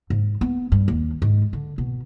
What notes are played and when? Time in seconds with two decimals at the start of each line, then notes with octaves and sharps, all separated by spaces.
0.10 G#2
0.41 B3
0.72 G2
0.88 D#2
1.22 G#2
1.53 D3
1.78 B2